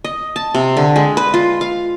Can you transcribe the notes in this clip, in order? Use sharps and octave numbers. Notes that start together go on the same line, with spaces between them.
D#5
A5
C3
D3
G#3
B4
F4
F5